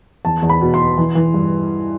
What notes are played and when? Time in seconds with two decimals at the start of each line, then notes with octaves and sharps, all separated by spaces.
0.25 E2 A5
0.42 E2
0.49 B5
0.61 B2
0.74 C6
0.80 B2
0.98 E3
1.15 E3
1.34 G2